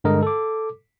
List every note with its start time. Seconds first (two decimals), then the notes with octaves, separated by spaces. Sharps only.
0.04 G2 D3 G#3 A#4 D#5
0.23 A4 D6